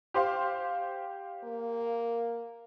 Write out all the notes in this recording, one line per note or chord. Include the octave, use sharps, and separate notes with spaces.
G4 C5 F5
A#3